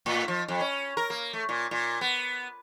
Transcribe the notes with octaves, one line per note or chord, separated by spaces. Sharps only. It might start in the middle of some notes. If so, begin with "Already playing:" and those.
A2
F3
F2
C#4
A#4
A#3
A3
A#2
A#2
B3